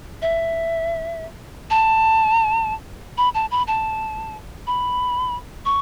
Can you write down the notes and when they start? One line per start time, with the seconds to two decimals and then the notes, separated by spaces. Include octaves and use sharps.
0.22 E5
1.70 A5
3.18 B5
3.34 A5
3.51 B5
3.68 A5
4.67 B5
5.65 C#6